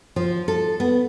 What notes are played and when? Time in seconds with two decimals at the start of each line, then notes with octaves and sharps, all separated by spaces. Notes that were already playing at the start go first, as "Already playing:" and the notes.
0.16 F3
0.48 A4
0.80 B3